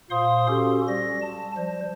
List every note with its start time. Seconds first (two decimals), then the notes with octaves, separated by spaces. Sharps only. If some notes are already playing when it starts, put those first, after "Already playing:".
0.10 A#2 C5 F5 C6 D#6
0.48 C#4 F#4 G4 A4
0.88 G3 A#6
1.22 A5
1.57 F3 G3 C5